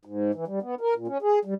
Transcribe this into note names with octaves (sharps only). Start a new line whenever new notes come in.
G#2
E3
G3
B3
A#4
A#2
C#4
G#4
G3